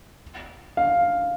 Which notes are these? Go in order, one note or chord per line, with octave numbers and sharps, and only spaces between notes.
F5